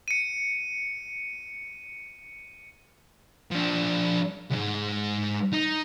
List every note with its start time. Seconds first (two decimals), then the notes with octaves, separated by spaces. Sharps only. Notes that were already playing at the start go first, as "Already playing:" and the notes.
0.08 C#7 D#7
3.51 F3 D4
4.51 C#2 G#2
5.53 D#4